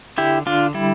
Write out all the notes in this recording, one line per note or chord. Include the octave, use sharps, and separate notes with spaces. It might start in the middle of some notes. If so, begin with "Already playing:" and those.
D3 E4 G4
D3 D4 F4
G3 E4